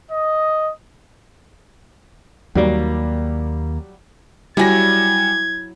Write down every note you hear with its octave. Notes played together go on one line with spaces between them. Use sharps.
D#5
D#2 F#3 G3 A#3
F#3 G3 E4 G#5 G#6 A#6